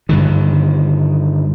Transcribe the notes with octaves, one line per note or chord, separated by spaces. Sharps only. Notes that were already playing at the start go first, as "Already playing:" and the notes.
G2 D3 D#3